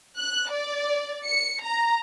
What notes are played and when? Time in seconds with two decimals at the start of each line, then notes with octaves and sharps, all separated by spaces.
0.18 F#6
0.51 D5
1.26 C#7
1.63 A#5